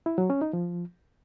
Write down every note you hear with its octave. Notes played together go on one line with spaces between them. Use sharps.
E4
F#3
C#4
D#4
F3